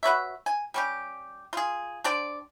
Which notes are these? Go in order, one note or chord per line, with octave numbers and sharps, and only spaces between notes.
F#4 B4 C#5 E5
G#5
G3 C#4 G4
F4 G#4
D4 G4 C5 D5